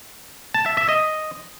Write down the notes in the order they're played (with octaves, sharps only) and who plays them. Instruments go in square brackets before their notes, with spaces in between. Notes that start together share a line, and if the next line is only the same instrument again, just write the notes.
[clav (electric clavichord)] A5
E5
E5
D#5